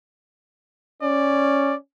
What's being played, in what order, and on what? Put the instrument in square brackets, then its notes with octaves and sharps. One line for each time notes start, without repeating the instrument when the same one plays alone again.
[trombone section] C#4 [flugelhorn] D5